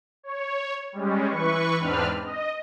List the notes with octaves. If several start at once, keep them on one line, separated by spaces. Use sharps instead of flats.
C#5
G3 G#3 C#4
E3 B4 C#6
E2 G#2 C4 D4 B4 F6
D#5